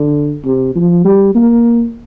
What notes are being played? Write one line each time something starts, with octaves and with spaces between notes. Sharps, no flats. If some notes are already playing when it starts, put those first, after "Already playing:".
Already playing: D3
C3
F3
G3
A#3